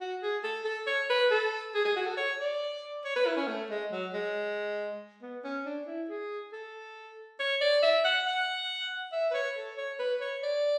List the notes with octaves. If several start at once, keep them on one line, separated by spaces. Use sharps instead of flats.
F#4
G#4
A4
A4
C#5
B4
A4
G#4
G#4
F#4
A4
C#5
D5
C#5
B4
E4
C#4
A3
G#3
F#3
G#3
B3
C#4
D4
E4
G#4
A4
C#5
D5
E5
F#5
F#5
E5
B4
C#5
A4
C#5
B4
C#5
D5